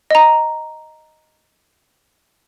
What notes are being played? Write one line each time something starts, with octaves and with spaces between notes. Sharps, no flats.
D#5 A#5